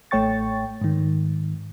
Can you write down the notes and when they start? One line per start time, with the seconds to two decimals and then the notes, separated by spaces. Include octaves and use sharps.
0.11 A1 A3 C#5 G5 C#6 A6
0.81 G#2 D#3